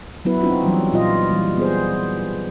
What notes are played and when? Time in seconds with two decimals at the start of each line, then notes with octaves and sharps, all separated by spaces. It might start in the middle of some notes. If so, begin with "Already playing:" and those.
0.25 F#3 B3 E4 B4
0.41 C4 C#4 D#4 F4 F#4
0.63 E3 F#3 G3
0.93 A#2 F4 D#5
1.31 E3 G3
1.57 B3 G#4 C5